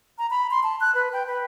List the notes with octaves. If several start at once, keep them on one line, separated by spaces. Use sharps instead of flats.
A#5
B5
C6
A5
F#6
B4
G5
B4